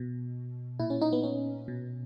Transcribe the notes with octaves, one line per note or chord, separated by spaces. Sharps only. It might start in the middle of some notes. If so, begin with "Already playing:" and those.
Already playing: B2
A#2 E4
C#4
D#4
B3
C#4
B2